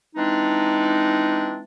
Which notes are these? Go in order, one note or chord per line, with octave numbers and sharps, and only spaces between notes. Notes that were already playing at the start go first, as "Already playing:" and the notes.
E3 G#3 C4 D4 D#4